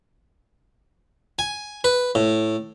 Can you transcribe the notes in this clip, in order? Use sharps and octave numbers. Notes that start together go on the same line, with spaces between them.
G#5
B4
A2